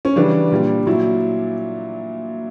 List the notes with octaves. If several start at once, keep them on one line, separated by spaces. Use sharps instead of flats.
C#4
C#3 E3 G3 D4
A#2 G3
A#2 F#3 E4